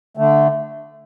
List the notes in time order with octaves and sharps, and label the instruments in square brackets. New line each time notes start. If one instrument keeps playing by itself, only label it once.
[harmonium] D3 A3